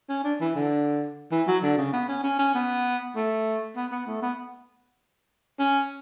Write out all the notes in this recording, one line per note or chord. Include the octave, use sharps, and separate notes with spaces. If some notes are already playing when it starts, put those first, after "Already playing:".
C#4
D4
E3
D3
E3
F#3
D3
C#3
B3
C#4
C#4
C#4
B3
A3
B3
B3
A3
B3
C#4